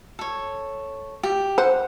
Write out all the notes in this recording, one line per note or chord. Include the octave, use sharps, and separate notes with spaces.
A4 C#5
G4
C5 F#5